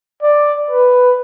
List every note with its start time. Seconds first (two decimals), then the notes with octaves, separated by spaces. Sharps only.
0.22 D5
0.71 B4